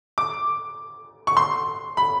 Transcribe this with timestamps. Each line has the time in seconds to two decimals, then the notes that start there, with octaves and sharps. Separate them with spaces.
0.18 D6
1.27 C#6
1.37 C6
1.97 B5